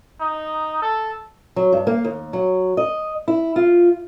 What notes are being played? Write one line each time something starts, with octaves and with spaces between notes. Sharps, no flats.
D#4
A4
F#3
G2
A#3
D#2
F#3
D#5
E4
F4